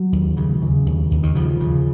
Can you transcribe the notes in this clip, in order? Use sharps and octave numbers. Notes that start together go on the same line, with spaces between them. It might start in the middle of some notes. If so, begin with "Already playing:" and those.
Already playing: F#3
D#2
C#3
C#3
D#2
D#2
D#3
C#3 F3
C#3